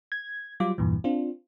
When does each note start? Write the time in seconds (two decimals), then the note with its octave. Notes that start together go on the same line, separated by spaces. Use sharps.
0.12 G#6
0.60 F#3 G3 F4 D6
0.78 E2 G2 A#2 E3
1.04 C4 D4 F4